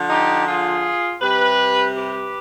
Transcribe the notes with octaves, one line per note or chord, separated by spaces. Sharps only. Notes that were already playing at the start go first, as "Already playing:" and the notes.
Already playing: D3 F3
D#4 G4
F4 G#4
C3 G3 G4 B4
G4 B4